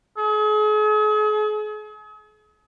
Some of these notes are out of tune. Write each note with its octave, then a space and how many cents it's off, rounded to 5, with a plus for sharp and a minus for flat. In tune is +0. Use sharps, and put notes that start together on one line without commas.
G#4 +40